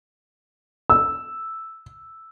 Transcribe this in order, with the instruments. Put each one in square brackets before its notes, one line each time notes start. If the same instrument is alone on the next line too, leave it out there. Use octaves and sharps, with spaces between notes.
[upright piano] E6